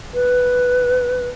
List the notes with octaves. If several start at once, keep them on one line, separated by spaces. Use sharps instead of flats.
B4